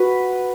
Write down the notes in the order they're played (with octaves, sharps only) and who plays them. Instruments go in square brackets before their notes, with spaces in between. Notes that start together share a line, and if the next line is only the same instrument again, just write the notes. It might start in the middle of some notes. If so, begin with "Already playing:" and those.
Already playing: [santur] F#4 B4